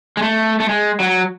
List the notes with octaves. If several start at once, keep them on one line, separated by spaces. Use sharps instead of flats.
G#3
A3
A3
G#3
F#3